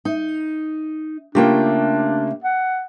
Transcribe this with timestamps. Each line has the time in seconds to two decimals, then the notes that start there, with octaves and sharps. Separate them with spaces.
0.05 D#4
1.35 C#3 A3 A#3 D4 F4 G4 G5
2.44 F#5